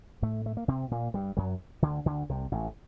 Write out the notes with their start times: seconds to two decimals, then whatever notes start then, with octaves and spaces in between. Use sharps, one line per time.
0.22 A2 A3
0.46 A3
0.57 A#3
0.68 C3 C4
0.91 A#2 A#3
1.14 G2 G3
1.37 F#2 F#3
1.82 D2 D3
2.06 D2 D3
2.29 C2 C3
2.52 A1 A2